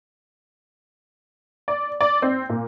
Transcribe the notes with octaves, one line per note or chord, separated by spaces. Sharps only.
D5
D5
C4
A#2